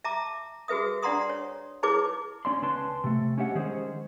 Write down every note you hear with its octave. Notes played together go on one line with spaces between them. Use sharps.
E5 A5 A#5 D6
F#4 G#4 B4 E5 D#6
D4 D5 F#5 A#5 C6 D#6
C#5
D#4 E4 G#4 B4 C#5 D6
C#4 D5 C6
C#2 C#4 B4 A5 C6
C3 A3
C#4 G4 E5 F#5
D#3 G#3 C#4 G#4 C5